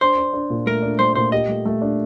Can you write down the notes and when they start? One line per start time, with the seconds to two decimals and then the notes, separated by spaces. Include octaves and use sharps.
0.01 D4 C5
0.18 D4
0.33 D4
0.50 A#2
0.66 A3 A#4
0.83 D4
0.99 A3 C5
1.15 A#2 C5
1.32 G4 D#5
1.48 A3
1.65 A3
1.82 D4